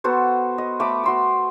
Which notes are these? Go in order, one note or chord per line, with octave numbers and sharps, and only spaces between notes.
B3 F#4 A4 C5
D#5
A3 B5 D6
F#4 C6 E6